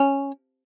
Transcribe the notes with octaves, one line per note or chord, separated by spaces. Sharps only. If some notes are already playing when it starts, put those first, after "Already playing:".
Already playing: C#4